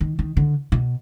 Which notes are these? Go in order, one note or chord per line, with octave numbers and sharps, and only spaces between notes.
D#3
D#3
D3
B2